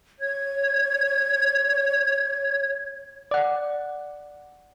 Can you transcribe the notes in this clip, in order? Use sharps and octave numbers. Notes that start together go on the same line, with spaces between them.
C#5 G#6
D5 F#5